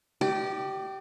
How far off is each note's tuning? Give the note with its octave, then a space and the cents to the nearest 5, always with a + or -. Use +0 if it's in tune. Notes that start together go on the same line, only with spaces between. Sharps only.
G4 -20 D5 +35